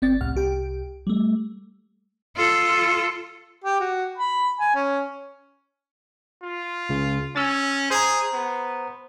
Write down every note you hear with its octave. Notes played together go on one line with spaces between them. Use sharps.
G1 C4 D5 A6
C2 A2 F#5 F6
C2 G4 G5
G3 A3
F4 A4
G4
F#4
B5
G#5
C#4
F4
C#2 C#3
C#4 E6 A6
G#4 C5 A#5
B3